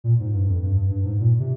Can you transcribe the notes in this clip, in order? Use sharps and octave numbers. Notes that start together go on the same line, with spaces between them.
A#2
G#2
G2
F2
G2
G2
G2
G#2
A#2
C3